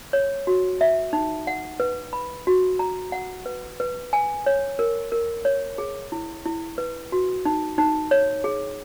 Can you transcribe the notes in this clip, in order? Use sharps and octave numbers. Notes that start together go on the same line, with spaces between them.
C#5
F#4
E5
D#4
F#5
B4
B5
F#4
A#5
F#5
B4
B4
G#5
C#5
A#4
A#4
C#5
G#4
E4
E4
B4
F#4
D#4
D#4
C#5
G#4